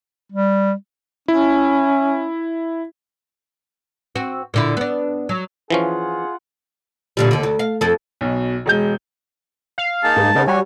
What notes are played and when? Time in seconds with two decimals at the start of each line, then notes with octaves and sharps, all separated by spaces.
0.32 G3
1.28 C#4 E4
4.15 C4 F#4
4.54 A#2 D3 E4
4.77 B3 D4
5.29 F#3
5.70 E3 F3 C#4 F4 G#4 F#5
7.17 A#2 D3 G3
7.31 D#2 D3
7.43 D2
7.59 F5
7.81 F2 A4
8.21 B1 B2
8.66 E1 G#3 G6
9.78 F5
10.04 A#3 D#4 G#4 A5
10.16 G#2
10.35 C#3 B3 D#4 A#4
10.47 G3 F#4 C#5 G#5